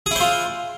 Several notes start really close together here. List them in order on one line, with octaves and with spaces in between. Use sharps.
G#4 E4 C5 F4